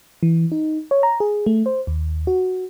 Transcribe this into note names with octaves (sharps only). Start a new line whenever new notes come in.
E3
D#4
C#5
A#5
G#4
A3
C5
D#2
F#4